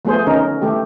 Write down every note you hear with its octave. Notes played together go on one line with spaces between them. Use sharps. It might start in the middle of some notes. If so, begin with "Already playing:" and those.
F3 A3 B3 G#4 C5
D3 C#4 D#4 A#4
E3 A3 G4